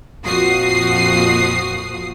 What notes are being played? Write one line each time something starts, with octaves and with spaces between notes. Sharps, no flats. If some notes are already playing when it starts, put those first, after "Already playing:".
F2 A#2 F3 F#4 D#6 C7